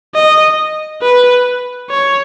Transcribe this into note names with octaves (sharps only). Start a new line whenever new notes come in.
D#5
B4
C#5